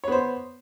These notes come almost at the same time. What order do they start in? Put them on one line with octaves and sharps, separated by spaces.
C#5 B3 C5